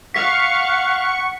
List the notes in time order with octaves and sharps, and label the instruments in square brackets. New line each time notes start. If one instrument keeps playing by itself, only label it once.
[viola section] F5 [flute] F#5 [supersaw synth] C#6 C#7 [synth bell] B6